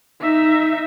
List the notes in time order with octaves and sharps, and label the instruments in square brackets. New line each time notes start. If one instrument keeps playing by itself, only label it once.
[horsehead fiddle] D#4 E5